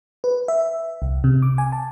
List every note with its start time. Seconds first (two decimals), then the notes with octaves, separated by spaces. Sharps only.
0.24 B4
0.48 E5
1.02 C2
1.24 C3
1.42 D6
1.58 G#5
1.72 A5